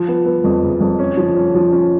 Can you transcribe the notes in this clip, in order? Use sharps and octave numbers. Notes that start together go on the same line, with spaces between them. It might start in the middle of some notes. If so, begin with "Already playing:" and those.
Already playing: F3
B3
B3
F2
F#1
F2
C#4
F3
C#4
F3
C#4